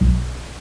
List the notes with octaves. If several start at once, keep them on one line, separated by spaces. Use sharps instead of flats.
B1